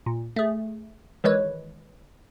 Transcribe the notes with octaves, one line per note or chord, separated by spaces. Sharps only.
A#2
A3 G#4
D#3 E3 G#3 B4 C#5